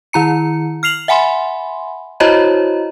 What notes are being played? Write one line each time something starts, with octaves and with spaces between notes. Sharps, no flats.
D#3 E4 A#5 C#7
F6 C7 F7 F#7
E5 F#5 G#5 B5 C6
E4 F#4 C5 C#5 D#5 A#5